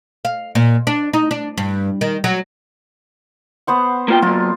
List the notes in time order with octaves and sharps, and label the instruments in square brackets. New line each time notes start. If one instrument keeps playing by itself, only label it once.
[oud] F5
A#2
D4
D#4
D4
G2
D#3
F#3
[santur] B3 C5 F#5
[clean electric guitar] A#3 F4 G5
[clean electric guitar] F#3 A#3 [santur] F4